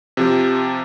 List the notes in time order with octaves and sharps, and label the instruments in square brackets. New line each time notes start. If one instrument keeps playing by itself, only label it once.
[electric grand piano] C3 F3 G4